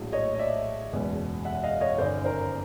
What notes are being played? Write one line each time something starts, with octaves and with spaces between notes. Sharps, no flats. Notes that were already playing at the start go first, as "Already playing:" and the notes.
Already playing: A#1 A2 F#3
C#5 D#5
D#5
D5 E5
F#1 E2 B2 G#3
E5 F#5
D#5 F5
C#5 D#5
G1 F#2 D#3 C5 D5
A#4 C5